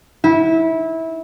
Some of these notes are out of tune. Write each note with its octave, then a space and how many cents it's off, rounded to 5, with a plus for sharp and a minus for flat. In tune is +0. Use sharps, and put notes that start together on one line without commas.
E4 -20